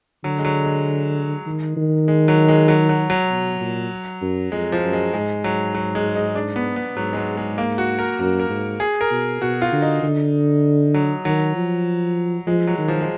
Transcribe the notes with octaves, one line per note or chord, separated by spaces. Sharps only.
D3 F#3
G#3
F#3
G#3
D#3
D#3
G#3
F#3
G#3
F#3
F#3
F#3
B2
A#2
F#2
F2 G#3
F3
F#2
G#3
G#2 G#3
F#3
F#3
G#3
D#4
D4
B3
B3
G#2 F#3
G#3
F#3
G#3
A#3
F#4
A#4
F#2 A#4
A#4
G#2
G#4
A#4
B2
B2 F#4
F4
D3
D#4
D3
F#3
D#3 F#3
F3
F3 G#3
F#3
D#3
F3
G#3